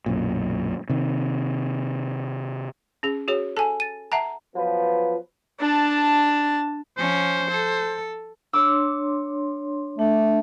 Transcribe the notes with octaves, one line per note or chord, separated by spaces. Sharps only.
B1 F#2 A#2
C3 D#3
C#4 G#4
F#4 G#4 C#5
A4 G#5 A5
A6 D#7
E5 F#5 A5 A#5
F3 F#3 B3 F4 B4
D4 A5
F3 C#4 C5
A4
D4 C#5 C6 D6 E6
A3 D4